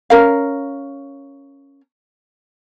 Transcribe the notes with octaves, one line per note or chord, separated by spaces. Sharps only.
C#4 A#4 F5